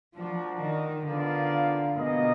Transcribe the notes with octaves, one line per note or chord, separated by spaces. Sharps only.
F3 D4 F#4 A#4 D5
D#3
D3 B3 F4 A#4 D5 F5
B2 A#3 F4 G#4 D#5